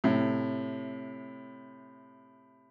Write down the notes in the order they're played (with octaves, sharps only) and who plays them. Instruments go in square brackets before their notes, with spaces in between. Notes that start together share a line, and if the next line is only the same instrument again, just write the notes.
[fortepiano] A2 C3